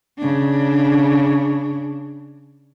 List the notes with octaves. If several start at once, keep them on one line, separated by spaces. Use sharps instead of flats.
C#3 D4